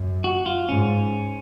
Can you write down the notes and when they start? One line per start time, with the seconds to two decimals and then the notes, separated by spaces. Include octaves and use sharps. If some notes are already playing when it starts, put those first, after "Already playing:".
Already playing: F#2
0.24 F#4
0.46 F4
0.69 G#2 C#4